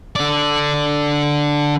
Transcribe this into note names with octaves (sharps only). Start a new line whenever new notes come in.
D3 D5